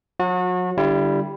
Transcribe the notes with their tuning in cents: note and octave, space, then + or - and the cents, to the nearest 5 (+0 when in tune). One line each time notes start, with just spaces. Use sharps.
F#3 -40 F#4 -30
D3 +0 G3 +0 E4 +35